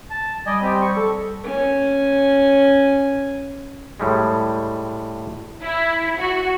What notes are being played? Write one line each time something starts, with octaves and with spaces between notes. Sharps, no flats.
A5
G3 D5 D#5 G#5
C4 G4
C#6
A4
C#4 G#5
A2 G3 G#3
E4
F#4